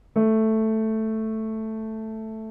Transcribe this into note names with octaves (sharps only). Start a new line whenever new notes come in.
A3